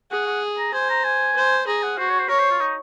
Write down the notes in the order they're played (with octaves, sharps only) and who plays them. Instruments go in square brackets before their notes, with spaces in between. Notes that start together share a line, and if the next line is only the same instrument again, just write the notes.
[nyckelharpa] G#4 [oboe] F#5
[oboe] F#5
A#5
[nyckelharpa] C5 [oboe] G#5
[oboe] A#5
G#5
[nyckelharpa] C5
[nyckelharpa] G#4 [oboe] A#5
[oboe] F#5
[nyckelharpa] F#4 [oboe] C5
[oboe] C#5
C5
[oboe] A#4 [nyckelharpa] C#5
[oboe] C5
F4
D#4